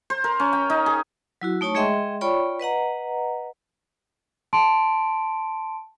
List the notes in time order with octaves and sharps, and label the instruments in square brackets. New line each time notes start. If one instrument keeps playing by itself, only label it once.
[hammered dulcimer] C5
A#4
C#4
G5
D#4
G#4
[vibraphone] F#3 E4 F#4
A3 D#4 C#5 A5 C#6
G#3 G#4 D#5 E5 G5 C6
F4 C#5 D5 G5 B5 C#6
B4 D#5 F#5 A#5
[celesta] A5 C6 D7